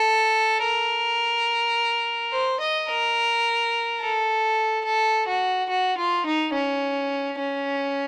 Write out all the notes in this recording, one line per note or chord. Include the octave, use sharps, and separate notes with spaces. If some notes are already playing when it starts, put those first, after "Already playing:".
Already playing: A4
A#4
C5
D#5
A#4
A4
A4
F#4
F#4
F4
D#4
C#4
C#4